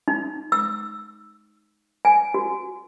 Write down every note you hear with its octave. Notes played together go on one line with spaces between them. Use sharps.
D#4
E6
G#5
F#4